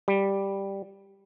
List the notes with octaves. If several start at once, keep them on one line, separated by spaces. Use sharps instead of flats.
G3